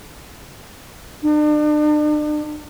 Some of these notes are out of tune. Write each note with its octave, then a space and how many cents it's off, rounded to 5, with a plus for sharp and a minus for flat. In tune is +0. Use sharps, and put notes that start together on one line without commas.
D4 +40